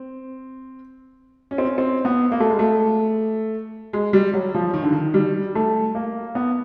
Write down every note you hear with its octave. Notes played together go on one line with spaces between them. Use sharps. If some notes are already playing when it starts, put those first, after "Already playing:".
Already playing: C4
C#4
C4
C#4
C4
B3
A#3
A3
G#3
A3
G#3
G3
F#3
F3
D#3
D3
D#3
G3
A3
A#3
B3